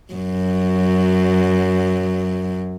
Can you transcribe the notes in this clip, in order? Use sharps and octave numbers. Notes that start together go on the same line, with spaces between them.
F#2 F#3